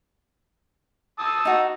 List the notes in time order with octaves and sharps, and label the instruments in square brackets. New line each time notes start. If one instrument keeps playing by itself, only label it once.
[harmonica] A5 D#6 E6
[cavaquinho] D#4 F#4